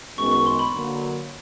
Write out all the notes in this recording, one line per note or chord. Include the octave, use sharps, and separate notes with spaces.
F#2 D#3 G#3 B3 C#6
C#6
C6
B5
D3 F#3 A#3